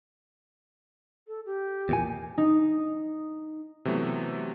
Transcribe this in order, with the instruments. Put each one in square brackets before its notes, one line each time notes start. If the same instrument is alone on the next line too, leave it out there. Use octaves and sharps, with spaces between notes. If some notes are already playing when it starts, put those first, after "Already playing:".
[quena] A4
G4
[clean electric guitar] E2 A#2 G#5
[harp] D#4
[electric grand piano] C3 E3 F#3 A3 B3